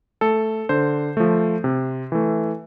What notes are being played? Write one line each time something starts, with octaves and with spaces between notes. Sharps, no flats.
A3 A4
D3 C5
F3 A3
C3
E3 A3